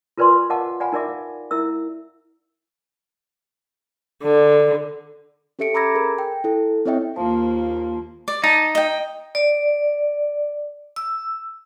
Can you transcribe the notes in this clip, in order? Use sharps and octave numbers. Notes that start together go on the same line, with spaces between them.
F4 A#4 B4 D5 G#5 C6
A#4 D#5 F5 F#5 A5 D6
D5 F5 F#5 G#5 B5
D#4 A#4 D5 E5 D6
F5
E4 A#4 E5 E6
D3
C#4 G4 A4 E5 C#7 D7
A#5 B5 D6 E6 G#6 A#6
G#4 A#4
G5
E4 A4
C4 E4 C#5 D#5 E5 G5
D#2 F3 A#3
D5
D#4 A5
D#5 G5
D5
E6